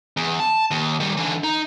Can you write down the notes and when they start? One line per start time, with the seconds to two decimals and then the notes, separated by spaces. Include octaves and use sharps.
0.17 E2
0.40 A5
0.71 D#2
1.00 D#3 G3
1.17 D3 E3
1.44 D#4